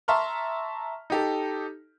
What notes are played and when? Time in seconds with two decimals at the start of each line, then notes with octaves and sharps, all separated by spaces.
0.08 E5 A5 A#5 C6 C#6 F6
1.10 D#4 G4 A4